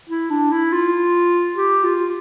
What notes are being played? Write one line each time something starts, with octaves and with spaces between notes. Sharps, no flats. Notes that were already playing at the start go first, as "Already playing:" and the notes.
E4
D4
E4
F4
G4
F4